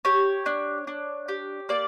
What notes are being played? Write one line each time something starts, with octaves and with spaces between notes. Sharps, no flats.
G4 C#5
D4
D4
G4
A#3 D5